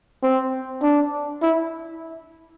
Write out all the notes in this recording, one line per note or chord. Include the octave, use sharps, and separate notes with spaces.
C4
D4
E4